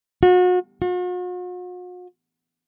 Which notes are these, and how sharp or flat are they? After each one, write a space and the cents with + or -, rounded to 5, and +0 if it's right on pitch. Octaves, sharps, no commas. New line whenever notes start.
F#4 -35
F#4 -45